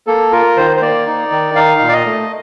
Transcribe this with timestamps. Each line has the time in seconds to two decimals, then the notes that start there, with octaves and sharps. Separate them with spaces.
0.07 A#3 A4
0.32 F4 A#4
0.57 D#3 C5
0.76 C5
0.81 A#3 D5
1.07 D#4
1.32 D#3
1.55 D#4 F5
1.81 A#2
1.89 D5
1.93 D#5
2.06 A3